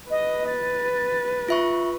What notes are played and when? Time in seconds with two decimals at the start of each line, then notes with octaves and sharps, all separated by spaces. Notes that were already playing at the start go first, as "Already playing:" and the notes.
0.10 B4 D#5
0.47 A6
1.48 F4 E5 C#6